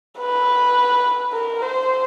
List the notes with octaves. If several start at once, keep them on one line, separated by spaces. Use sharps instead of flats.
B4
A#4
C5